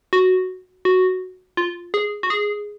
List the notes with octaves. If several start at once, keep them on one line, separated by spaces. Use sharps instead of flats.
F#4
F#4
F4
G#4
F#4
G#4